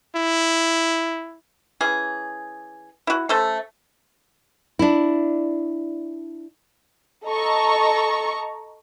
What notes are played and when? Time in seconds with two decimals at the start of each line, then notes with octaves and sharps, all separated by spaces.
0.15 E4
1.81 E3 C#4 G#4
3.07 E4 F#4
3.29 A3 C#4 A4 C5
4.79 D4 E4
7.26 A4 D#5 A#5 C#6